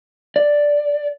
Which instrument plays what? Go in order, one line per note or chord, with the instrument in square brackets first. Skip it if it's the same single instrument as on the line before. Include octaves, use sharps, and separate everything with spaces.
[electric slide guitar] D5